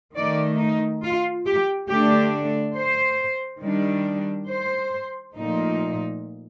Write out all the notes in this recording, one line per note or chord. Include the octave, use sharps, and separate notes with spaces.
D#3 A3 D#4 D5
D#4
F4
G4
D3 A3 D4 G4
C5
D#3 G3 D4
C5
A#2 F3 A3 D#4